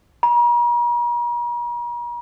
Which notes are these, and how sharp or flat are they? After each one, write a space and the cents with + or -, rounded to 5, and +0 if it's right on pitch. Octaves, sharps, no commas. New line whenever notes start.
A#5 +45